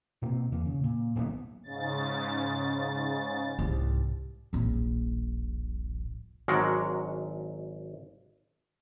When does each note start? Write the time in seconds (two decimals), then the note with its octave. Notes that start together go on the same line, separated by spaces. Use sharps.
0.22 B2 A#3 C4
0.52 E2 A#3
0.65 C#3
0.84 A#2
1.15 D#1 B1 A#3 B3
1.63 G#2 C#3 A6
3.58 C2 G#2
4.53 D#1 A#1
6.48 G#1 F#3 G#3 D4 A#4 F#5